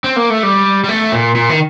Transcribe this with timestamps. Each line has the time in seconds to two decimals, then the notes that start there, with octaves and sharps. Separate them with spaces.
0.04 C4
0.16 A#3
0.30 A3
0.43 G3
0.84 G3
0.89 A3
1.12 A#2
1.35 A#2
1.49 D#3